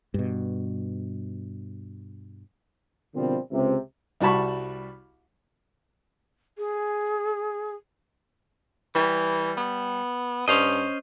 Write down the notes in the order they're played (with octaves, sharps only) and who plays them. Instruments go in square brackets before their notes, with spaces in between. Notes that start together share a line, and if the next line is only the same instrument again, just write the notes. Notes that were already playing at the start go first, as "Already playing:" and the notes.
[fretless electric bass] G2 B2
[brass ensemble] B2 D3 F3 G3 C4 A#4
C#2 C3
[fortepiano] C2 G3 F#4 A5 B5 C#6
[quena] G#4
[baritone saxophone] E3 [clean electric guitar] G3
[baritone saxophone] B3
[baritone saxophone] G2 [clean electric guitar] C#4 C5 D#5